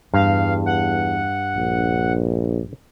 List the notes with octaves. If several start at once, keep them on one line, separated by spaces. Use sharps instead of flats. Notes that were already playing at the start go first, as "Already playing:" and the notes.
E2 G2 F5
F#5
A#1